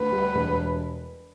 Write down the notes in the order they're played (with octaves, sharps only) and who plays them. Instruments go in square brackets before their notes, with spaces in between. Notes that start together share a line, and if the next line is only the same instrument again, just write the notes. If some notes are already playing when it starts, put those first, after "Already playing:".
Already playing: [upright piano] D2 [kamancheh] B4
[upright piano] G3
E1